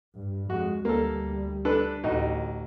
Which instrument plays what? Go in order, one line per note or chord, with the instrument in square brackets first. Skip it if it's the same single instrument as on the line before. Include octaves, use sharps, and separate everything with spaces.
[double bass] G2
[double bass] F2 G#3 [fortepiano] F#4
[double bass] D2 G3 [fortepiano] A#3 A4
[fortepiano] D4 A4 B4
[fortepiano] A1 D#4 F#4 [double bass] D2